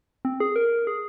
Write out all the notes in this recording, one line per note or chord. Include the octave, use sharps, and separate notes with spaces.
C4
G#4
A#4
G#4